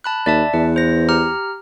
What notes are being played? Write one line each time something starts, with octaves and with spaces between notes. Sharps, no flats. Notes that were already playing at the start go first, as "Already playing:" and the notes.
A5 B5 F#6
D#2 D5 E5 A5
E2 B4
C5 A#6
G4 A#5 F6